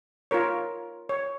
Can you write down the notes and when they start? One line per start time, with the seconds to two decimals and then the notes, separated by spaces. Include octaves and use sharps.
0.31 F4 A#4 C#5
1.09 C#5